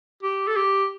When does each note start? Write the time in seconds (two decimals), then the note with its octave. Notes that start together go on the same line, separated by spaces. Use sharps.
0.23 G4
0.47 A4
0.56 G4